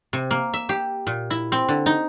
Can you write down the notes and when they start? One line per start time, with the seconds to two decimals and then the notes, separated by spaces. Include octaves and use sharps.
0.13 C3
0.31 A#3
0.54 E5
0.69 G4
1.07 A#2
1.30 E4
1.52 C4
1.69 D3
1.86 D#4